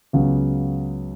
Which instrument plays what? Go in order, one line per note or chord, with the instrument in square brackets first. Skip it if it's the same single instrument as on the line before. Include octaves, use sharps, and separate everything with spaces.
[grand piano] C#2 C#3 F#3 B3